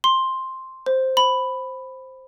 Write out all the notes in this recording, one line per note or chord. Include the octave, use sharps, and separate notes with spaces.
C6
C5
B5